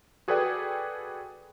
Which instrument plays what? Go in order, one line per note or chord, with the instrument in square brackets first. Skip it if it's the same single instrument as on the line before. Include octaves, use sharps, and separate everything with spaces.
[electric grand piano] F#4 G#4 A4 B4 D5 G5